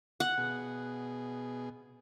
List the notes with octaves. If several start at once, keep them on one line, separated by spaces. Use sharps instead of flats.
F#5
B2 G#4